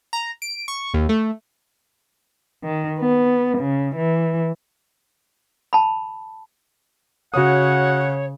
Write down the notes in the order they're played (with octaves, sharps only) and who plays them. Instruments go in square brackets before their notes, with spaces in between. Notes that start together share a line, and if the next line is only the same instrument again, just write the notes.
[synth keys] A#5
D7
C#6
D#2
A3
[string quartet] D#3
B3
C#3
E3
[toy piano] A5 B5
[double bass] C#3 [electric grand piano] F#4 D#6 [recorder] C#5 [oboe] F#5